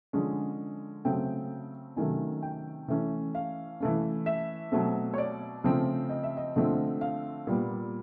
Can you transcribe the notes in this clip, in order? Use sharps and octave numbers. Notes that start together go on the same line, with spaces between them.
D3 F3 G#3 C#4
C#3 F#3 A3 C4 G5
C3 D#3 F#3 A3 C#4 G#5
G5
E3 A3 C#4
F5
E3 A3 C#4
E5
B2 F#3 A3 C4
C#5
D5
C#3 F3 A3 C4
D#5
E5
D#5
D3 F3 A3 C4
F5
A#2 G3 B3